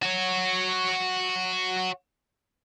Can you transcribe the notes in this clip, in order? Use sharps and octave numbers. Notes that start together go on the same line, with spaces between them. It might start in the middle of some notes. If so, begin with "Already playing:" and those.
F#4 C#5